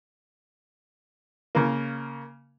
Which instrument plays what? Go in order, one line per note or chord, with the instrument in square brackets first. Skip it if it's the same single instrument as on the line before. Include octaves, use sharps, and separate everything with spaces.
[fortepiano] C#3 A#3